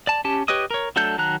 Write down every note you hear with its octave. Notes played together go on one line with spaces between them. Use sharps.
D5 A5
C#4 G4 A5
G4 B4 C#5 D#5 D#6
A#4 C#5
F#3 A3 D4 A4 G6
D#3 F#3 A5 A#5 F#6